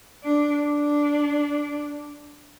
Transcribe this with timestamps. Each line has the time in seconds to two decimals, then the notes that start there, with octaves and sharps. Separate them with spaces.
0.23 D4
0.64 D4